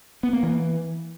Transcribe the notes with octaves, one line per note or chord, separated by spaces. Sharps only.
B3
A#3
E3